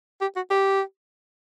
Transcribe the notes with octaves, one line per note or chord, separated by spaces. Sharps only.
G4
F#4
G4